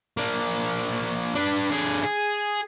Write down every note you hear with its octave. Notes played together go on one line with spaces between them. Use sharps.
A#3 D4
D4 B4
D3 G#4
G#4